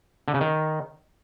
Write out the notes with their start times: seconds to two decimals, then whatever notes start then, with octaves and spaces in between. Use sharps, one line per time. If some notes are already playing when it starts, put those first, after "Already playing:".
0.28 D3
0.34 C#3
0.41 D#3